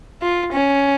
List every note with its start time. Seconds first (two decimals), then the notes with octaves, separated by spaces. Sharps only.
0.22 F4
0.53 C#4